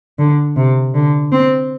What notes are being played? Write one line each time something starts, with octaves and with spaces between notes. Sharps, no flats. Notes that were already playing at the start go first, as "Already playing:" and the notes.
D3
C3
D3
C4